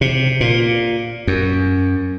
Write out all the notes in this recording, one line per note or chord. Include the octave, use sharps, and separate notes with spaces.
C3
A#2
F#2